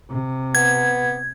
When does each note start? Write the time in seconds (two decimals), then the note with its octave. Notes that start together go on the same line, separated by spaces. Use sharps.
0.10 C3
0.55 B3 G#6